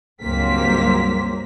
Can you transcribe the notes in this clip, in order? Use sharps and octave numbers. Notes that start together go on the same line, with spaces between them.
C#2 G2 F#3 A#3 C4 B6